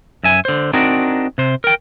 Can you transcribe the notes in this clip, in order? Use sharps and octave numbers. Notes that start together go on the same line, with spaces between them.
F#2 E5 G#5
D3 C5
C4 D4 D#4 F#4 A#4
C3 C5
A#4 G5